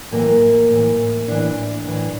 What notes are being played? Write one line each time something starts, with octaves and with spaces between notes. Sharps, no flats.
A2 E3 A#3
A2 E3
A2 E3 D4
A2 E3